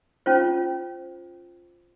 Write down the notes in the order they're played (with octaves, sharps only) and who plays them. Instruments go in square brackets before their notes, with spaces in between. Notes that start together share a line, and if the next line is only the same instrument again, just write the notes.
[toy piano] C#4 F4 C5